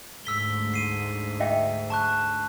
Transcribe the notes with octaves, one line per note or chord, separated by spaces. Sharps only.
D2 G#2 E6 B6 G7
C7 D#7
D#5 E5 G5
A5 C#6 F#6